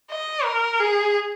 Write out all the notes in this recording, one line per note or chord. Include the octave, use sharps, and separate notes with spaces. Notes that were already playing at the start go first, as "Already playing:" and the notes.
D#5
A#4
G#4